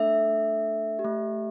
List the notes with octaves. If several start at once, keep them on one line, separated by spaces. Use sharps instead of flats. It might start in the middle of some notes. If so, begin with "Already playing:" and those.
Already playing: A3 D4 A4 E5
G4
A3